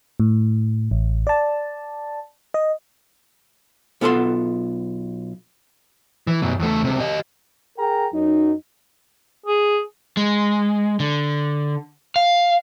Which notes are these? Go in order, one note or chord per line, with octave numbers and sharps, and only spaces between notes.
A2
A1
D5 A5
D#5
B1 B3 F4 A4 F#5 C6
E3
F#2 B2
E2 A3
C#2 C3
G4 D#5
G#4 A#4 G5 A#5
F#2 F#3 D#4
G#4
G#3
D3
F5